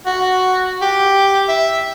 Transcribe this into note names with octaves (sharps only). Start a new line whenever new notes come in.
F#4
G4
E5